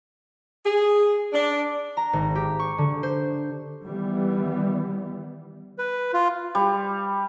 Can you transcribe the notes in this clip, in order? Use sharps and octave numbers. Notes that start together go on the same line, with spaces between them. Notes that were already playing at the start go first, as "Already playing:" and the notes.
G#4
D4
A#5
G#1
G4
C#6
D3
C5
D#3 E3 G3 B3
B4
F4
G3